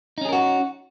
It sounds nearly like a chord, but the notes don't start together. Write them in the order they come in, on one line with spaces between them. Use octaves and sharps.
D#4 C#4 G#4 A#4 F#4